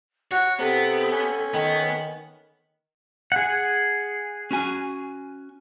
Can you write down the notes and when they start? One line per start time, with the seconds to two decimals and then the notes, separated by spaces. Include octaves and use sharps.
0.31 F#4 C#5 F#6
0.59 C3 B3 A4
1.12 C#4
1.54 D#3 B3
3.32 G#4 F#5
4.51 C#4 F#4 G#5